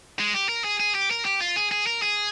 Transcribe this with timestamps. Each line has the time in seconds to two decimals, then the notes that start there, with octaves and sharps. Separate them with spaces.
0.19 G#3
0.34 G4
0.49 A#4
0.64 G#4
0.80 G#4
0.95 G4
1.11 A#4
1.25 G4
1.41 F4
1.56 G#4
1.71 G#4
1.87 A#4
2.02 G#4